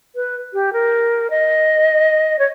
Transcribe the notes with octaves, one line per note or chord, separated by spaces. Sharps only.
B4
G4
A#4
D#5
C#5